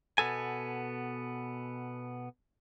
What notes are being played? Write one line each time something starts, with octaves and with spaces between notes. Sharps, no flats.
B2 B3 A4 G#5